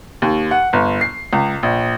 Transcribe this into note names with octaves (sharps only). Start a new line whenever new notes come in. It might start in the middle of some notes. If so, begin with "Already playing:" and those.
D#2
F#5
G1
C7
C#2
A#1